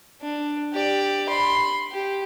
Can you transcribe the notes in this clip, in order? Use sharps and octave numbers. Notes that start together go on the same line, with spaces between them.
D4
G4 D5
B5 C6
G4